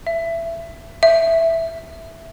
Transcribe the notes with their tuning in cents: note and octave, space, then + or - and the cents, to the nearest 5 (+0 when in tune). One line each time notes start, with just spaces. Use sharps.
E5 +20
E5 +0